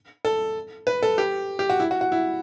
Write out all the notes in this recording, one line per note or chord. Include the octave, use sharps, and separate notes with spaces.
A4
B4
A4
G4
G4
F#4
E4
F#4
F#4
E4